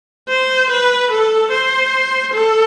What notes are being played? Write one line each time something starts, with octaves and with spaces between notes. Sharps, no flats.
C5
B4
A4
C5
A4